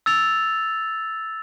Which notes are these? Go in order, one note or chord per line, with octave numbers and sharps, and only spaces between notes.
E6 A6 F7